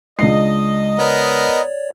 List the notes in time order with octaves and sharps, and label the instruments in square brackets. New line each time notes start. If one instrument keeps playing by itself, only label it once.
[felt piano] C#2 D4 C7 [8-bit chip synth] G#3 [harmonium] D#5
[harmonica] B3 A#4 [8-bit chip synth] C#5 D5